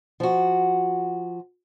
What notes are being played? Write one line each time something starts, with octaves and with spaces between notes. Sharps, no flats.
F3 F#4